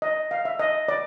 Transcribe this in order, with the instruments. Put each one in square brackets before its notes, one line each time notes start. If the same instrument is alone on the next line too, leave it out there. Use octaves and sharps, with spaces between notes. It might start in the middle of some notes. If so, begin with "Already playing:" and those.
[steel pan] D#5
F5
E5
D#5
D5